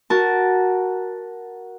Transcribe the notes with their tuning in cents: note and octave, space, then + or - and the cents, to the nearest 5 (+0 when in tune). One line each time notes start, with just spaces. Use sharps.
F#4 +0 A#4 +5 A5 +0